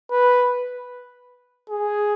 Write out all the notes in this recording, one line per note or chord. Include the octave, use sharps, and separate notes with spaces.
B4
G#4